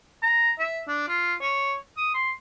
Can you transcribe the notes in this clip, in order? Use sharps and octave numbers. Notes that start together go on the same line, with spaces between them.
A#5
E5
D4
F4
C#5
D#6
C6